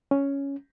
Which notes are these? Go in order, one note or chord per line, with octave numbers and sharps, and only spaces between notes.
C#4